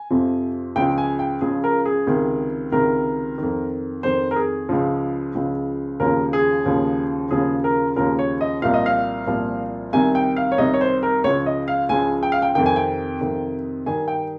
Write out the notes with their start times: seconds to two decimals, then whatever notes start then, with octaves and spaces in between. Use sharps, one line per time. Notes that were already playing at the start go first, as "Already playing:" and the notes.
Already playing: G#5
0.10 F2 C3 F3
0.76 C#2 C#3 F3 G5
0.98 G#5
1.19 G5
1.41 C#2 C#3 F3 G#4
1.64 A#4
1.85 G#4
2.07 C#2 C3 D#3
2.72 C#2 C3 D#3 A#4
3.38 F2 D#3
4.03 F2 D#3 C5
4.31 A#4
4.36 G#4
4.69 C#2 C#3 F3
5.35 C#2 C#3 F3
6.00 D#2 C#3 F3 A#4
6.33 G#4
6.66 D#2 C#3 F3
7.31 D#2 C#3 F3 G#4
7.64 A#4
7.96 D#2 C#3 F3 A#4
8.19 C#5
8.41 D#5
8.62 C2 A#2 F3 F5
8.74 D#5
8.86 F5
9.27 C2 A#2 F3
9.93 C2 C3 D#3 G#5
10.15 G5
10.36 F5
10.52 C#5
10.58 C2 C3 D#3 D#5
10.74 C#5
10.81 C5
11.03 A#4
11.24 C#2 C#3 F3 C#5
11.46 D#5
11.68 F5
11.89 C#2 C#3 F3 G#5
12.23 G5
12.32 F5
12.42 G5
12.55 F2 C3 D#3 G5
12.66 G#5
12.76 G5
13.21 F2 C3 D#3
13.86 G2 D#3 G#5
14.08 G5